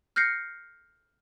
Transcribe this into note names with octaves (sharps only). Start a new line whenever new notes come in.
F6 G6 A#6 C7 C#7